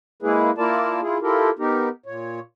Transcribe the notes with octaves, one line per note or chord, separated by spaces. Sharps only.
G#3 A#3 E4 G#4 B4
A#3 E4 F4 A#4 D5 A5
E4 F4 G#4
E4 F4 G4 A4 A#4
B3 D#4 G4 A#4
A#2 C#5